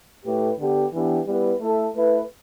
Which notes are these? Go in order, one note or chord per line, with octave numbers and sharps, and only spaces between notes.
A2 A3 G4 B4
D3 B3 G4
E3 B3 D4 G4
G3 B3 E4 B4
A3 E4 A4
A3 E4 B4